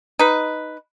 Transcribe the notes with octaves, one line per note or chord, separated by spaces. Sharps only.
D#4 B4